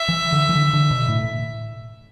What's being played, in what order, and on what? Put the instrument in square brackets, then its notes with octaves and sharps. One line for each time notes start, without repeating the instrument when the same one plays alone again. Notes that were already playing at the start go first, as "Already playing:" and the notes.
Already playing: [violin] E5
[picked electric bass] E3
D3
E3
D3
D3
B2
A2